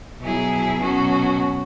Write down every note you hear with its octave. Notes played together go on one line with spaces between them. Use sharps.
B2 F#3 E4 G#4
B2 F#3 C#4 F#4